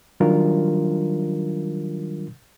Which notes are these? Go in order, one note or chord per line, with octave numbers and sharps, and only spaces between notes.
D#3 F#3 G3 D4 F4 A#4